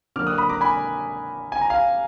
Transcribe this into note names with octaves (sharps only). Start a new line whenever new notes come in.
D3 F#3 A#3 D6 F6
D#6 F#6
B5 D#6
A#5 D6
G#5 B5
G#5
A#5
F5 G#5